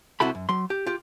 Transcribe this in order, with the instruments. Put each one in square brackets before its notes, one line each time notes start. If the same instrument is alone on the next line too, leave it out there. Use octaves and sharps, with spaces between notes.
[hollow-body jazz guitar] C2 C3 E4 F#4 A4 B5
F#2
F#3 C6
G4
F4 G4